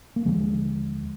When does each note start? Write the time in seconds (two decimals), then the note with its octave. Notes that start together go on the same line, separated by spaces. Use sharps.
0.16 A#3
0.25 D#2 D3 F3 G#3